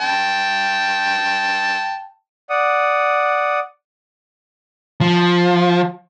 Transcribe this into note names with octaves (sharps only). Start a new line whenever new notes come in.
G5 A5
D5 F#5 D#6
F3